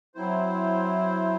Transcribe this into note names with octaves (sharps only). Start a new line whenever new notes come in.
F#3 C4 E4 C5